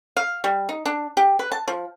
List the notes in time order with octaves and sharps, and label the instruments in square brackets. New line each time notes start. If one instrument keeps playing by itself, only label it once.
[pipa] F5
G3
D#4
D4
G4
B4
A5
F3